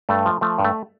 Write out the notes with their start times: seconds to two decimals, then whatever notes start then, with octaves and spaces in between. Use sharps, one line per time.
0.09 G2 A3
0.26 F3
0.41 F3 A3
0.58 G2
0.64 A3